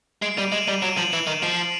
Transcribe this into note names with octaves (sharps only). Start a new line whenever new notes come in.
G#3 C7 D7
G3 D#7 F7
G#3 E7 F#7
G3 D#7 F7
F#3 D7 E7
F3 E7 F#7
E3 D7 E7
D#3
F3 C7 D7